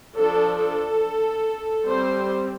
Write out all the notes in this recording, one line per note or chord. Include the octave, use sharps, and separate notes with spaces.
F3 D4 A4
A4
G3 C4 C5